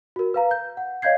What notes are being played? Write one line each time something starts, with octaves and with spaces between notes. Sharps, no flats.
F#4 A#4
B4 F5 A#5
G6
F#5
C#5 D#5 F5 G6 G#6 C7